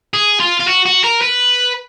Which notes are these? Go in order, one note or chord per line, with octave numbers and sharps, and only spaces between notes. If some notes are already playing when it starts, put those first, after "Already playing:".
G#4
F4
F4
F#4
F#4
A#4
B4